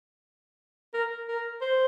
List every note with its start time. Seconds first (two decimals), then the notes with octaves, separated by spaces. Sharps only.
0.94 A#4
1.28 A#4
1.61 C5